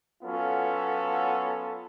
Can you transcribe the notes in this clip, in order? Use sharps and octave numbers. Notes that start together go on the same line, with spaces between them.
F#3 B3 C#4 F4 A4